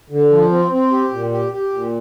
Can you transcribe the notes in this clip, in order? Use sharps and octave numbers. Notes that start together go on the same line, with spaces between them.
D3
F3
C4
C4
G4
A#2
G4
G4
A#2